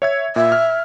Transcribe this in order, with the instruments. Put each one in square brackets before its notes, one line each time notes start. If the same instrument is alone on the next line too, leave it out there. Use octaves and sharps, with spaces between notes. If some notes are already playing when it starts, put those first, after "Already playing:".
[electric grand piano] C#5 E5 G#6
[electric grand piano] A#2 [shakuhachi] E5
[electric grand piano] F6